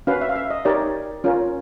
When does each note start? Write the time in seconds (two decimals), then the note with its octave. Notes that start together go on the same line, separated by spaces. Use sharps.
0.07 C#4 F#4 B4 F5
0.21 E5
0.29 F5
0.36 E5
0.50 D#5
0.65 D#4 G4 A#4 C#5 D5
1.24 C#4 F4 A#4 C#5